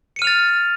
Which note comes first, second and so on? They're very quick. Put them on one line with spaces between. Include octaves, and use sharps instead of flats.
C#7 D#7 F6 F7 A6